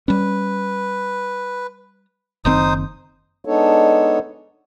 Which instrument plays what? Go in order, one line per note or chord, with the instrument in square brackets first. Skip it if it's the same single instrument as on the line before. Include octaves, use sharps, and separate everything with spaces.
[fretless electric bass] G3 C#4 [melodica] B4
[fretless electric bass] F#1 D#3 C4 [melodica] D#4 C5 D#6
[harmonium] G#3 B3 D4 D#4 A4 C#5